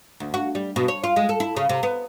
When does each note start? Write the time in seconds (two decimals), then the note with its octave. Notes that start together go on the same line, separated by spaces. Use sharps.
0.20 D2
0.34 F#4
0.55 G3
0.76 B2
0.88 C#5
1.04 F4
1.16 G#3
1.29 A4
1.40 E4
1.56 C#3
1.69 C3
1.83 B3